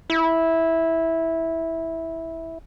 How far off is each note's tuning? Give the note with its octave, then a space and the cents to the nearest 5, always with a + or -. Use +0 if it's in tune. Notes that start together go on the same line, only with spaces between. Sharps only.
E4 -10